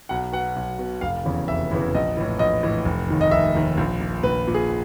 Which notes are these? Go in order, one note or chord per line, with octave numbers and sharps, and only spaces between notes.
B1 F#5
B2 F#5
B1
B2
F1 F5
E2 C#3 E3
F1 E5
E2 C#3 E3
A#1 D#5
A2 E3
A#1 D#5
A2 E3
F1
D#2 D#3
D#5
F1 E5
D#2 D#3
A#1
A#2
A#1 B4
A#2
G#4